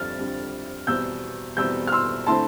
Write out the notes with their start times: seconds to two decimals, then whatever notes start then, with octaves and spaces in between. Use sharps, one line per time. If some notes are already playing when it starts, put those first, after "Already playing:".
Already playing: F2 D3 G3 F6 A6
0.18 F2 D3 G3
0.87 E2 B2 G3 C4 E6 G6
1.57 E2 B2 G3 C4 E6 G6
1.87 F6
1.92 C6 E6
2.26 D3 A3 C4 E4 A5 C6